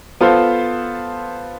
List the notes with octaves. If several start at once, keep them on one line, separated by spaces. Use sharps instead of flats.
B3 F4 A4 C5